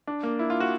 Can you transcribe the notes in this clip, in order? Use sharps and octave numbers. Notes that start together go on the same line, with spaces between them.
D4
A#3
E4
F4
F#4